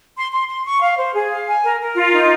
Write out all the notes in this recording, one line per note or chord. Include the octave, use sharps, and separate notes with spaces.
C6
C6
C6
C#6
F5
C5
G#4
F5
G#5
A#4
A#4
F4
D#4